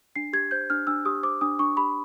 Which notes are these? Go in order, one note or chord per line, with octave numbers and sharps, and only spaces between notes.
D4 C7
G4 G#6
C5 G6
D4 F6
D4 E6
G4 D#6
C5 D6
D4 D#6
D4 C#6
G4 B5